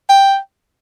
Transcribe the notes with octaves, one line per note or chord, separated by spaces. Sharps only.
G5